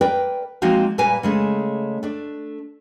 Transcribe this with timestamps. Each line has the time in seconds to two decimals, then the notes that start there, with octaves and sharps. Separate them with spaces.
0.01 A#4 B4 D5 G5
0.62 F3 G#3 A#3 C4 D#4 F#4
0.98 A#2 G3 B4 F5 G#5
1.23 C#3 G#3 A3
2.03 A3 D4